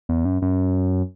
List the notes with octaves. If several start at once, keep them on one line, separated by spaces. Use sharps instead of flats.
E2
F#2
F#2